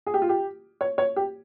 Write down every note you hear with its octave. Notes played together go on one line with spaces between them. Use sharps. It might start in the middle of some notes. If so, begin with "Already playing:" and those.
G#4
G4
F4
G4
C#5
C#5
G4